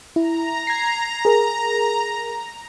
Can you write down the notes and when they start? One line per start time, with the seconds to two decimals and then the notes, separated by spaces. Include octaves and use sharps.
0.16 E4 A#5
0.67 G#6 A#6 C7
1.25 G#4 A#4